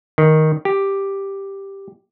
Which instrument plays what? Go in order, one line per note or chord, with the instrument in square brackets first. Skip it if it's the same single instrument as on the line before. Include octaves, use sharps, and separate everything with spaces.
[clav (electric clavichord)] D#3
G4